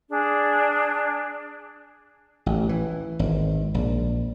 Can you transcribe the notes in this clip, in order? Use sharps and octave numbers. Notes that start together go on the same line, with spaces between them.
D4 G#4
A1
E3
G#1
A#1